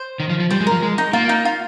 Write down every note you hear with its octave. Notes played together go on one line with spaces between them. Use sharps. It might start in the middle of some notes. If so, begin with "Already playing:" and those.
Already playing: C5
D#3
F3
F3
G3 C5
G#3
F3 A#4
G#3
D#4
A#3 F4
D#4
F4